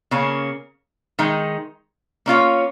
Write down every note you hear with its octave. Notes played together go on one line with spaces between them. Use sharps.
C#3 A#3 C#4
D#3 G#3 D#4
A#3 C#4 F4 C#5